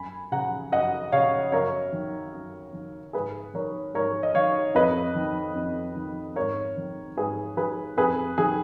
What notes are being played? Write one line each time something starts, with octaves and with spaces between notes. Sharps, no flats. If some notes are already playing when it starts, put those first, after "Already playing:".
Already playing: F#2 G#5 B5
C#3 F#5 A#5
F#2 D#5 F#5
C#3 C#5 F5
F#2 A#4 C#5
D#3
F#2
D#3
G#2 G#4 B4
D#3 A#4 C#5
G#2 A#4 C#5
D#5
D#3 C#5 F5
F2 B4 D#5
D#3
F2
D#3
G#2 A#4 C#5
D#3
G#2 G#4 B4
D#3 G#4 B4
F2 G#4 B4
D#3 G#4